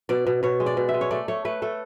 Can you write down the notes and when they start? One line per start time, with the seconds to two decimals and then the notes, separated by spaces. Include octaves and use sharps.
0.09 B2 D5
0.27 B2
0.43 B2 C#5
0.60 G#3
0.66 D5
0.77 B2
0.89 E5
0.94 G#3
1.01 C#5
1.11 A3 D5
1.28 A3 C#5
1.45 A3 B4
1.62 A3 A4